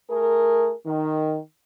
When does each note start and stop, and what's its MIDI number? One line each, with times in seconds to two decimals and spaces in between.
0.10 0.73 57
0.10 0.73 68
0.10 0.73 70
0.86 1.37 51